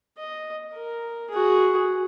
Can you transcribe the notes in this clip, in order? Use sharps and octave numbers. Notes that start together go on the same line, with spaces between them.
D#5
A#4
F#4 G#4